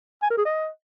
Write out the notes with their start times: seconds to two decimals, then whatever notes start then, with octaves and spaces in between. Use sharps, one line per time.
0.22 G#5
0.30 A#4
0.38 G#4
0.45 D#5